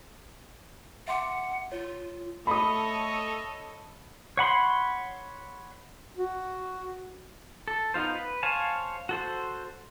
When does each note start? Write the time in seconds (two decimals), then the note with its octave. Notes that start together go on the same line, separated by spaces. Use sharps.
1.08 E5 F#5 C6 D6
1.72 F4 C#5
2.47 A3 A4 C#5 D#5 B5 D#6
4.37 C#5 F#5 B5 C6
6.17 F#4
7.68 A4
7.94 B3 D#4 F4 C5
8.15 B4
8.43 C5 C#5 F5 G#5 A5
9.09 F#4 A4 C5